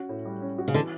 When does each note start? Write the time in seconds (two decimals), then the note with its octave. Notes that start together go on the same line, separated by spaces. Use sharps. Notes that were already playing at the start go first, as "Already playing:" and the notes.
Already playing: C#4 F#4
0.09 A2
0.25 G3
0.42 C#4
0.58 F#4
0.68 C#3
0.74 D3 E3